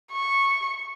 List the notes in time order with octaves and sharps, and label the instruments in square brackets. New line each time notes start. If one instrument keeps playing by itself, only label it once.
[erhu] C#6